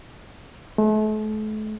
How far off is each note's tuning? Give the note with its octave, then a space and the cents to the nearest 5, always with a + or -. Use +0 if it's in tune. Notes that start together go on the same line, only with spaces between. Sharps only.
A3 -40